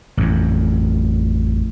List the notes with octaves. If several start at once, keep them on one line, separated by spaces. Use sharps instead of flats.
A1 F2